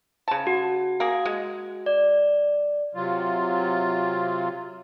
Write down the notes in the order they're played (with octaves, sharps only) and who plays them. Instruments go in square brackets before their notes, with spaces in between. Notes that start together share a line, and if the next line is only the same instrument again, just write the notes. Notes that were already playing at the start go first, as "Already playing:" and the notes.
[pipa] C#3 A5
[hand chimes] F#4
[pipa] A#3 G#4
G#3
[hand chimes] D5
[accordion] C3 F#3 F4